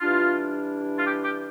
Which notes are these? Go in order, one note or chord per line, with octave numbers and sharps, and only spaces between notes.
E3 G3 D4 F4
F4
G4
G4